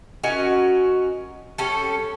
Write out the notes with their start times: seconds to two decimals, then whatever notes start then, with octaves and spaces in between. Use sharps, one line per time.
0.23 C#4 F#4 A#4 D#5
1.58 G3 C#4 A4